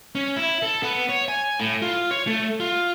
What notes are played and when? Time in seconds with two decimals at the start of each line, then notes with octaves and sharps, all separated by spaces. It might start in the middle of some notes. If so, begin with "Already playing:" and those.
0.15 C#4
0.36 E4
0.62 A4
0.83 B3
1.09 C#5
1.28 G#5
1.60 A2
1.82 F4
2.11 C#5
2.27 A3
2.60 F4